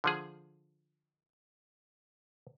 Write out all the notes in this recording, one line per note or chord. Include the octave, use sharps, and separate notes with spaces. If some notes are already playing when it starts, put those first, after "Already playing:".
D3 F3 G#4